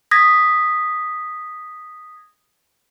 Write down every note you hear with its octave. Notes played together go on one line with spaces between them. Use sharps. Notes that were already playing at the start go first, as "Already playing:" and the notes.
D#6 G#6 A#6 B6